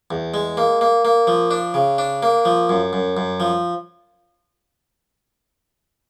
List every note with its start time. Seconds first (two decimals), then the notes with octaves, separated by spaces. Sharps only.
0.11 E2
0.34 G#3
0.57 A#3
0.81 A#3
1.05 A#3
1.27 F3
1.51 D4
1.74 C#3
1.98 D4
2.23 A#3
2.45 F3
2.69 F#2
2.93 F#2
3.17 F#2
3.40 F3